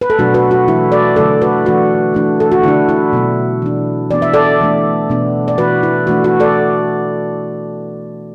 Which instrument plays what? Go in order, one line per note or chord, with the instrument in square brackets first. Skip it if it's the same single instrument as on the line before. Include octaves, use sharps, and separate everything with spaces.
[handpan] B4
A4
B2 F#3 A3 D4 F#4
F#4 B4
F#4
E3 A3 D4 E4
A4 D5
D3 F#3 A3 D4 A4 D5
F#4 B4
E3 A3 D4 F#4
E3 A3 D4
A4
F#4
D3 A3 D4 E4
E4
B2 F#3 B3 D4
E3 D4
E3 B3 D4 D5
E5
A4 D5
E3 A3 D4
B2 B3 D4
D5
E3 D4 F#4 B4
E4
E3 A3 D4 F#4
F#4
A4 D5